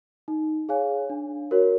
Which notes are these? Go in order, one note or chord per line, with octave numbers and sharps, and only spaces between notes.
D#4
G#4 C#5 F5 G#5
D4
F#4 A#4 C#5